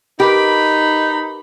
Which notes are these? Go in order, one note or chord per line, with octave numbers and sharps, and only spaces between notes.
D#4 G4 A#4 B4 B5